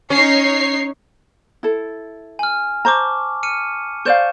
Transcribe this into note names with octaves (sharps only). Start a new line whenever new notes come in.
C#4 D#4 C#5 C7
E4 A4
G#5 F6
C5 A5 A#5 C#6 D6
F6 C#7 D#7
C5 D5 F5 C#6 G6 E7